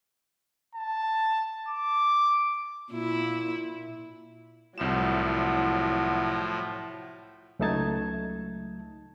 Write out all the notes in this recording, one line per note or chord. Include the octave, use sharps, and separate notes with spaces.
A5
D6
A#2 E4
C2 A2 F3 F#3 E4 E7
C#2 F#3 A3 D#4 A5 G#6